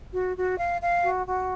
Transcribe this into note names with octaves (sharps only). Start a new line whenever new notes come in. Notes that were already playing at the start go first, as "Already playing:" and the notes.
F#4
F#4
F5
F5
F#4
F#4